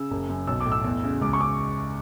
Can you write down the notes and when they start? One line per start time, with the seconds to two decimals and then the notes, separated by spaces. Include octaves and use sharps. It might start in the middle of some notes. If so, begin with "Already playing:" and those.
Already playing: C#3 E6
0.11 F#1
0.29 F#2
0.47 B1 E6
0.60 D6
0.66 A2
0.72 E6
0.84 E2
1.04 C#3
1.21 C#2 D6
1.33 C#6
1.40 C#3 D6